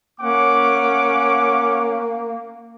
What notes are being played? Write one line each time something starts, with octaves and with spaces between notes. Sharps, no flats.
A#3 C#4 F#5 D6